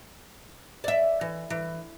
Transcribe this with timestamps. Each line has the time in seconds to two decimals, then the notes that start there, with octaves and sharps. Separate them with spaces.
0.84 D5 E5
1.21 E3
1.50 E3